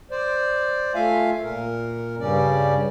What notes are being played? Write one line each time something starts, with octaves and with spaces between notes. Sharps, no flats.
C5 D5
A3 F4 E5 F5 G#5
A#2 A#4
G2 C#3 G3 C#4 D5